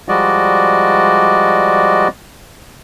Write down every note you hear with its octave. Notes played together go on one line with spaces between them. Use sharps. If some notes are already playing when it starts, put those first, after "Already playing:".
F3 G3 G#3 F#4 D5 D#5